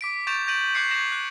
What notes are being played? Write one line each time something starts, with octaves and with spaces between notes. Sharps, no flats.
D6 B6 D7
C#6 G6 A6 D7 E7 F7
G6 A#6 D7 D#7 F#7
C#6 D6 F#6 G#6 C7 C#7
G#6 A#6 E7 F#7
F#6